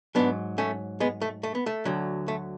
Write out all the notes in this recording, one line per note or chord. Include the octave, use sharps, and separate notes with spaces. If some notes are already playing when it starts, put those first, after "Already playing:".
G#2 F#3 B3 D4
A3 C#4
G#3 B3
A3
A3
B3
A3
D2 D3 F#3
A3